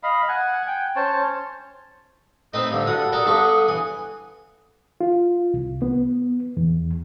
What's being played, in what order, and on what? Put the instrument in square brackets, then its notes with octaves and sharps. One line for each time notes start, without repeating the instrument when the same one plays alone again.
[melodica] D#5 F5 B5
F#5 G#5
G5
C#4 C5 C#5 A5
[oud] A2 [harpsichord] C4 B4 D#5 [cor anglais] D#4
[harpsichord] G2 D3
[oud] G2 G3 F#4 [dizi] A4 [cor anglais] F#5 [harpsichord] D#6
[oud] G3 [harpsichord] A4 A#4 [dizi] D#6
[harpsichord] G2 B3 C#6 [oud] A4
[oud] E3 [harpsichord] G#5
[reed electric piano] F4
C2
B3
E2